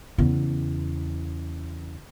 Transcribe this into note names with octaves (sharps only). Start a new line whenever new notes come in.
E2 C#3